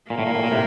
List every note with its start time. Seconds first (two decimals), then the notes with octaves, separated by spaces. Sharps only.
0.10 A#2 A#3
0.19 A2
0.27 A#2
0.35 A2
0.43 A#2
0.51 A2 C3